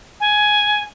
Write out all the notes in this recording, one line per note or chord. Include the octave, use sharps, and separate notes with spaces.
G#5